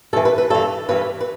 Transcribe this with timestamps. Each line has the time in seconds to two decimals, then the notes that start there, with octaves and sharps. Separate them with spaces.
0.13 G2 A4
0.16 E3
0.25 B4
0.38 B4
0.50 G2 E3 A4
0.88 G2 E3 B4
1.21 B4